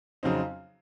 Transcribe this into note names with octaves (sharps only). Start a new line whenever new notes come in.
F2 C#3 F#3 C4 D#4